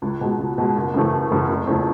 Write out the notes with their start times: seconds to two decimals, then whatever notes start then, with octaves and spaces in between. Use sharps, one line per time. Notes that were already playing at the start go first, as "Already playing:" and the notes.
0.02 C#2
0.21 B2 G#3
0.39 C#2
0.58 B2 G#3
0.76 F#1
0.94 F#2 C#3 E3 A3
1.13 F#1
1.30 F#2 C#3 E3 A3
1.49 F1
1.67 E2 C#3 F3 A3